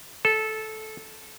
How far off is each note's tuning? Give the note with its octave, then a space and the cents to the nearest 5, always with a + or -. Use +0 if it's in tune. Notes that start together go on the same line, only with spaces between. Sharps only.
A4 -15